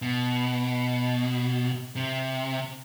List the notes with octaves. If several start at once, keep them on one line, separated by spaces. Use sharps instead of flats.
B2
C3